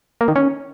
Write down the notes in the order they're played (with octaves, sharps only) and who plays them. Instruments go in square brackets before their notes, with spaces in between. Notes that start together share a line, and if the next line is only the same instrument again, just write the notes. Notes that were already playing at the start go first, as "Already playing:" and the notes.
[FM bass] A#3
D#3
C#4